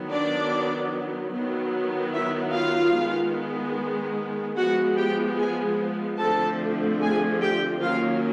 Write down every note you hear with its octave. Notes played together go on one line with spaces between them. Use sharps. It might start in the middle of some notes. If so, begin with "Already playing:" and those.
Already playing: D#3 F#3 B3
D4 D5
D#3 F#3 B3
E4 E5
F4 F5
D#3 G#3 B3
F3 G#3 B3 F#4 F#5
G4 G5
G#4 G#5
D3 F3 A3 C4 A4 A5
G#4 G#5
G4 G5
D#3 F#3 A#3 C#4 F4 F5